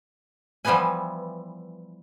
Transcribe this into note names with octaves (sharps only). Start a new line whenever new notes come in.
E3 F3 G3 B3 B4 G#5